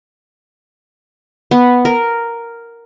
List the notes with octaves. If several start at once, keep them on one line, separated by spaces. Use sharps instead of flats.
B3
A#4